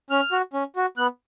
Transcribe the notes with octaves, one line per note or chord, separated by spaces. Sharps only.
C#4 F6
F#4
C#4
F#4
B3 F#6